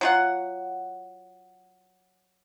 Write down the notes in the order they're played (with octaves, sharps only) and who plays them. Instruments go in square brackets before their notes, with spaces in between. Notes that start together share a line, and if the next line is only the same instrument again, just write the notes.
[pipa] F#3 F4 F#5